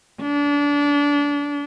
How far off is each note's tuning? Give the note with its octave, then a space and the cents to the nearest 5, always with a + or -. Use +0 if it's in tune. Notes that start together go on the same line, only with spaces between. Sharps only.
D4 -30